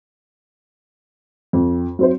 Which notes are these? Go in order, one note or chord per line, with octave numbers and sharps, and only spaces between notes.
F2
F#3 C4 C5